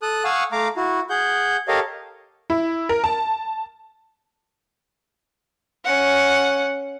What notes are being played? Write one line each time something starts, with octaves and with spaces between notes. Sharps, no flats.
A4 D#6 F#6
F5 F#5 G#5 C#6 D#6 E6
A3 F5 A#5 D6
E4 F#4
G#4 F#5 G6
G4 A4 A#4 C#5 D#5 F5
E4
A#4
A5
C#4 F#5